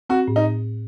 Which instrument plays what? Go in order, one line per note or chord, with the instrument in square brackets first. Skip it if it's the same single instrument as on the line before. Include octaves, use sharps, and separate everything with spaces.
[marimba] C4 [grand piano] F#4
[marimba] A2
[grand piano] D#4